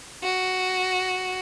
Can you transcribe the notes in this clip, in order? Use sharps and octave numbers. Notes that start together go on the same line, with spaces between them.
F#4